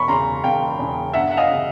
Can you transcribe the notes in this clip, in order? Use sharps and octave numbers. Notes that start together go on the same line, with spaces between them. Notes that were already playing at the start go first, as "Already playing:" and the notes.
Already playing: E1 B5 C#6
E2 C#3 A#5 C6
E1 F5 G5
E2 C#3
G1 E5 F#5
F#5
D#5 F5
C#3